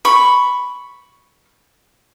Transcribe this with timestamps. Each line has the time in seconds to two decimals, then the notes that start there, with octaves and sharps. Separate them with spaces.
0.05 B5 C#6